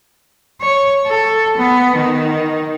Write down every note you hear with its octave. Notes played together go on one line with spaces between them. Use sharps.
C#5
A4
B3
D#3